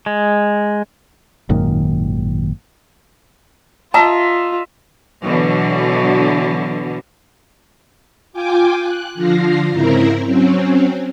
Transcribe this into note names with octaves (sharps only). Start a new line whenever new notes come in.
G#3
G#1 F#2 A#2 D#3
F4 D#5 E5 A5 A#5
B2 D3 E3 F#3
F4 G5 G#5 D6
F#6
D3 F3 F4 A#6 C7
G#2 C#3 C4 E4 A#4 A#5
F#3 C4 C#4